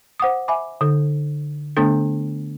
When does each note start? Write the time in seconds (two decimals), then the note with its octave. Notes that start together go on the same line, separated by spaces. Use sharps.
0.20 C5 F#5 D6 D#6
0.48 E5 G#5 B5 D6
0.81 D3 D#4 A4
1.77 D3 A3 B3 D4 A4